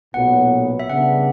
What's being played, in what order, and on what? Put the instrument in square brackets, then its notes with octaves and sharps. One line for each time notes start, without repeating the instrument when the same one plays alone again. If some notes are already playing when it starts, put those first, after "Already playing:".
[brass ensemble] B1 A#2 F#3 B3 [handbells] F#5
[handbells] E5
[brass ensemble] C#3 G3 B3 D4 [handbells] F#5